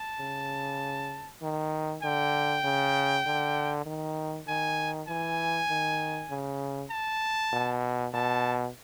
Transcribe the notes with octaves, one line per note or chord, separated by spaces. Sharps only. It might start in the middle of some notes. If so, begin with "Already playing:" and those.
Already playing: A5
C#3
D#3
D3 G5
C#3
D3
D#3
D#3 G#5
E3 G#5
D#3
C#3
A5
B2
B2 A5